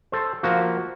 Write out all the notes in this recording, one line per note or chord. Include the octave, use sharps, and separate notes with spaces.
A4 C5
F3 A#3 F#4